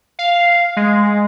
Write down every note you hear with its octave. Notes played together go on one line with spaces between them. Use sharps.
F5
G#3